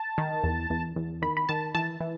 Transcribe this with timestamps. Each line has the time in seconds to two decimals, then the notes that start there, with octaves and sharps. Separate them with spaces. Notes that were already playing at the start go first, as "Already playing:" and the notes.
Already playing: A5
0.18 D#3
0.43 E2
0.70 E2
0.96 E2
1.22 D#3 B5
1.37 B5
1.49 D#3 A5
1.75 E3 A5
2.00 E3